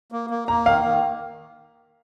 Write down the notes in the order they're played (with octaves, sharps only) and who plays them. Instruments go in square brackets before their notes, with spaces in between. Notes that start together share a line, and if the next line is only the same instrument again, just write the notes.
[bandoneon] A#3
A#3
[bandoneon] A#3 [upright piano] A#5
[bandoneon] D#3 [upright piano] F5
[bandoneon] D#3